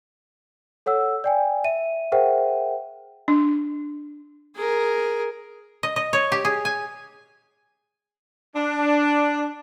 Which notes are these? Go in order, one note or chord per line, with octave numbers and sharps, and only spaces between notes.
A4 C#5 F#5 E6
D5 G5 G#5
E5 D#7
G#4 A#4 C5 E5 F#5 G5
D4
G#4 A#4
D#5
D#5
C#5
G4
G#4
G#5
D4